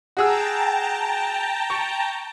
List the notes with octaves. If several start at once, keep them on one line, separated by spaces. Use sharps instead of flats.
F#4 G#4 G5 A5 A#5 E6
C#6